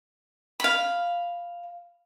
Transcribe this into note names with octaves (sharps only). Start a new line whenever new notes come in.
F5 B5